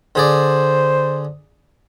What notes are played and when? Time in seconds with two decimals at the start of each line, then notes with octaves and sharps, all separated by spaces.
0.15 D3 G#4 C5 D5